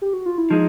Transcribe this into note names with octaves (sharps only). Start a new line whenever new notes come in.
G4
F#4
F4
E4
F3 G#3 D#4